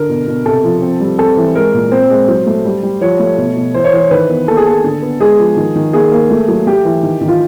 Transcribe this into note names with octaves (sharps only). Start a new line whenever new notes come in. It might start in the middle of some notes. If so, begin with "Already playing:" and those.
Already playing: D3 A#4
B2
B2
C3 A4
F3
C4
G3
C4 A4
E3
G#3 A#4
A#2
C4 C5
G#3
F#3
A3
G3
G3
F3 C#5
A3
B2
B2
E3 C5
C#5
E3 C5
D#3 B4
B3
A#3 A4
G#4
A#3 A4
D3
B3
G#3 G#4
F3
D#3
D#3
A#3 G#4
A#3
A3
F#3
A3 G4
E3
D#3
D#3
F4